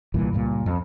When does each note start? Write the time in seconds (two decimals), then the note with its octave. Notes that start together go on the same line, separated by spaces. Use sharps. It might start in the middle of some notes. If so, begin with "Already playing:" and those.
0.14 C2 G2 A#2 E3
0.33 C#2 G2 A#2
0.66 F2